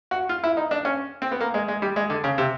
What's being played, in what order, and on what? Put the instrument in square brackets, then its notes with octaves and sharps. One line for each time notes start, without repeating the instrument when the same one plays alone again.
[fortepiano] F#4
F4
E4
D#4
D4
C#4
C4
B3
A#3
G#3
G#3
G3
G#3
D3
C#3
C3